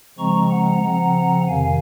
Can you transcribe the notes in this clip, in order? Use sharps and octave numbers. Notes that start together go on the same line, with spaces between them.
C#3 F3 G#3 C4 A#5 C#6
F#5 A#5
C#3 F3 C4 F#5 A#5
F2 C3 D#3 F5 G#5